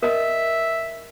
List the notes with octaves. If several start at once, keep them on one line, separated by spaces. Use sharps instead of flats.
A#4 D#5 E5